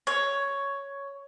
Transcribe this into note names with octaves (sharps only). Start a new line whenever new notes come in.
C#5